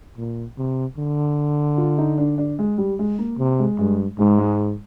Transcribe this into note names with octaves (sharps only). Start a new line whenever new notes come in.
A#2
C3
D3
F4
D#4
D4
D4
G#3
G3
G#3
A#3
C3
G#3
G2 G#3
G#2 G#3
G#3